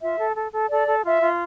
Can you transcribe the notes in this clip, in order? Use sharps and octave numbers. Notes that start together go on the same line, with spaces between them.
F4 E5
A4
A4
A4
A4 D5
A4
F4 E5
F4